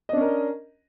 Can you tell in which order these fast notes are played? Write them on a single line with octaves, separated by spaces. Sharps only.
D#5 D4 C#4 A#4